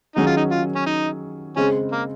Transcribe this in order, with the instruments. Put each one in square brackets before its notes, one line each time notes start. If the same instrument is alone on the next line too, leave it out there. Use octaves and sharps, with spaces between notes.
[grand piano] D#3 F#3 C#4 G#4 [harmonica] D#4
[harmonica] F4
D#4
F4
C#4
D#4
[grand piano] C#3 G#3 C4 [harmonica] C#4
[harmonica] A#3